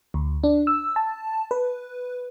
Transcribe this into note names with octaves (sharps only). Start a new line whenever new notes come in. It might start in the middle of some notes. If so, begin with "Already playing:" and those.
D2
D4
E6
A5
B4